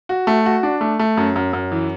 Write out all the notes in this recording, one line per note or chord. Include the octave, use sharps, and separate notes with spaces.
F#4
A3
F#4
D4
A3
A3
F#2
F#2
F#2
E3